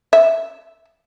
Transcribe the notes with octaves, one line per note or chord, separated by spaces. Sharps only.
E5